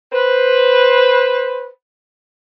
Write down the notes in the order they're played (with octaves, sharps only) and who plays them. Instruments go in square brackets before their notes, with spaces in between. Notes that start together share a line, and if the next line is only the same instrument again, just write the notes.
[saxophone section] B4 C5